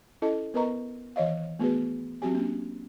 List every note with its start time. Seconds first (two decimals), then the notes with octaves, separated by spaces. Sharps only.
0.22 C#4 E4 A4 D#5 A5
0.54 B3 A#4 B4 D#5 A#5 C#6
1.16 D#3 E3 C#5 D#5 F5
1.59 A3 B3 F#4 G#4 B4
2.22 F#3 C4 F#4 G4 G#5
2.34 A#3 C#4 D4